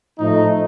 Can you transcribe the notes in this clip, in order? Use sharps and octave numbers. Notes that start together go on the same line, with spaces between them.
A2 F3 A3 D#4